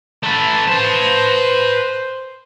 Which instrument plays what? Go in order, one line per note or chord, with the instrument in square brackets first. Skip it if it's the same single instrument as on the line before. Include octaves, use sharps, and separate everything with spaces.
[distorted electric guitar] A3 B4 [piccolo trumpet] A5
[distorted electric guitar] B4 A5 [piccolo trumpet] C5